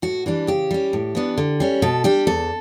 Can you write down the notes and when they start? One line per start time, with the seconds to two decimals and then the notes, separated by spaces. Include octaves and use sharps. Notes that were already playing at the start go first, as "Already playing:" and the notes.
0.02 A2 F#4
0.26 E3 G3 D4
0.47 C#3 G4
0.71 G3 C#4
0.93 A2
1.15 E3 B3 D4
1.38 D3
1.60 G3 C#4
1.82 B2 A4
2.04 G3 D4 G4
2.27 E2 A4